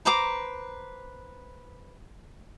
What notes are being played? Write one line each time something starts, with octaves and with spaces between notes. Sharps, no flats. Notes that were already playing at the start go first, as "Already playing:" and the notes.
B4 C5 A#5 D6